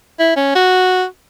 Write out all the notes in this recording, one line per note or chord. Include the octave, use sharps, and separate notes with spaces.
E4
C#4
F#4